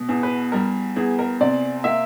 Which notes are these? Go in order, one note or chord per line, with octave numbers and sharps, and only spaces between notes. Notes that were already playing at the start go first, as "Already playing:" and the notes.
Already playing: B2
E2
B4
G3 A#4
E2 G#4
A#4
C3 D5
A#3 E5